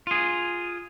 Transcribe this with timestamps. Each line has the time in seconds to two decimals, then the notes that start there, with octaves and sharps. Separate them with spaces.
0.07 F4 G#4